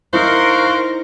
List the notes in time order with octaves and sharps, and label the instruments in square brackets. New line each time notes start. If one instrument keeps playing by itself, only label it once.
[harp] D#4 E4 [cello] A#4 [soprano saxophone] C5 [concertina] F5 C#6 F#6